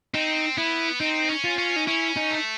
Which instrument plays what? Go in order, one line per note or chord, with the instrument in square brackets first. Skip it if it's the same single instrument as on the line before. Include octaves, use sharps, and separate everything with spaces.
[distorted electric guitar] C4 [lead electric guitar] D#4
[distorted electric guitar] B3 [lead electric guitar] E4
[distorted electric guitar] C4 [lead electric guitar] D#4
[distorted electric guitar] C#4
[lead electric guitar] F4
[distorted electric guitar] C#4
[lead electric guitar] D#4
[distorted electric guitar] C#4 [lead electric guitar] E4
[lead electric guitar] D#4
[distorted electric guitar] A3